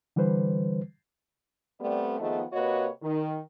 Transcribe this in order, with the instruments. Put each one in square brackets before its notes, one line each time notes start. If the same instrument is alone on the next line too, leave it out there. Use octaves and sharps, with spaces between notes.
[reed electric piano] D3 E3 G3 B4 C5
[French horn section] G3 A3 B3 C4 D5
D#3 F3 A3 B3 G#4 D#5
C3 A#3 F#4 B4 C#5 D#5
D#3